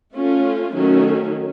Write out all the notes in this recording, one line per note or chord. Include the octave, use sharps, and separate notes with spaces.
A3 C#4 F4
D#3 F#3 A3 C#4